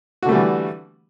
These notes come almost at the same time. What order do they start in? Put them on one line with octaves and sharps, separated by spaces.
F#4 D3 A3 G3 E3